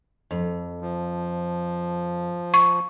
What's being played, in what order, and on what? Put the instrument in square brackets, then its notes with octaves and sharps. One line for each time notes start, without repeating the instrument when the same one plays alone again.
[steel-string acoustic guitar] F2
[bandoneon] F3
[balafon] C#6